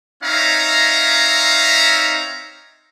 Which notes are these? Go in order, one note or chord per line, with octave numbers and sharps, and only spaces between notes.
C4 D#4 C#5 E5 F5 A#5